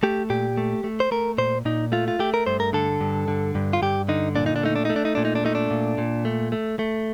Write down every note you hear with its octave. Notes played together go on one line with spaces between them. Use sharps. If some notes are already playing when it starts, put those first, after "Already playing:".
A3 G4
A#2 G4
A3
A3
C5
A3 A#4
A#2 C5
A#2 D#4
A3 F4
F4
A3 G4
A#4
G2 C5
A#4
D3 A4
G2
D3
G2
F4
G2 G4
D3 D#4
A#2 D4
D#4
D4
A3 D#4
D4
A3 D#4
D4
D#4
A#2 D4
D#4
D4
A3 D#4
D4
A#2
A#2
A3
A3
A3